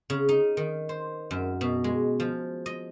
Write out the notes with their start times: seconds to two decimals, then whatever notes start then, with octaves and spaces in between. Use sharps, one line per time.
0.10 C#3
0.29 D#4
0.57 D#3
0.89 C5
1.31 F#2
1.61 B2
1.84 G#3
2.20 F3
2.66 D#5